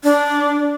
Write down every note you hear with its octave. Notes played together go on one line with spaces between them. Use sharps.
D4